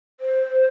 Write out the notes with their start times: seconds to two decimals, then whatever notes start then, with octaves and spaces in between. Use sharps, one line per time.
0.20 C5